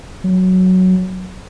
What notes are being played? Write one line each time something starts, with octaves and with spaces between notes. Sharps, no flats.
F#3